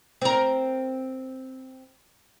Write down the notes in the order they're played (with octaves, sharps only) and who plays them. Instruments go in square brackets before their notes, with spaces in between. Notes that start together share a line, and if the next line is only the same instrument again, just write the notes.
[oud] C4 A#4